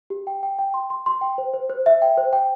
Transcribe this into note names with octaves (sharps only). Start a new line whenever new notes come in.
G4
G5
G5
G5
C6
C6
C6
G5
C5
C5
C5
E5
G5
C5
G5